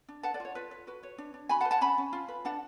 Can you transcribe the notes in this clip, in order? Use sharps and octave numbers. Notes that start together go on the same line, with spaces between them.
D4
B4 F#5 A5
B4 D5
F4 C#5
F4 B4
B4
F#4 B4
B4 C#5
D4
D4
F#4 G#5 B5
F#5 A5
B4
F#5 A5
C#4 G#5 B5
C#4
F4
B4
D4 F#5 A5